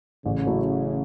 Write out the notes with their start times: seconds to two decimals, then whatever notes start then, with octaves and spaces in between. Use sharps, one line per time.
0.24 A1 C#3
0.47 F#3 A3 E4